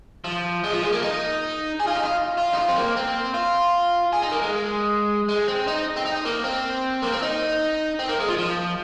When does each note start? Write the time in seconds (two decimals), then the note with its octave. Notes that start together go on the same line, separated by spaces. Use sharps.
0.24 F3
0.64 G#3
0.73 F3
0.82 G#3
0.92 A#3
1.02 D#4
1.80 G#4
1.87 F4
1.96 D#4
2.03 F4
2.37 F4
2.53 D#4
2.57 F4
2.68 C4
2.76 A#3
2.96 C4
3.34 F4
4.13 G#4
4.22 D#4
4.32 A#3
4.42 G#3
5.29 G#3
5.48 C4
5.67 D#4
5.96 C4
6.06 D#4
6.25 A#3
6.44 C4
7.02 A#3
7.12 C4
7.22 D#4
7.99 C4
8.09 A#3
8.19 G#3
8.28 F3
8.38 F3